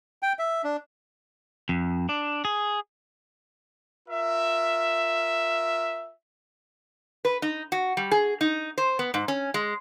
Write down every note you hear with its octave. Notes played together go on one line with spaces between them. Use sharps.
G5
E5
D4
F2
D4
G#4
F4 A#4 E5
B4
D#4
F#4
G3
G#4
D#4
C5
B3
G#2
C#4
G#3